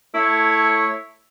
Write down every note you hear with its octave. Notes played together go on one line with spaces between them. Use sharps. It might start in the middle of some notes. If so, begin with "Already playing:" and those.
A3 E4 C#5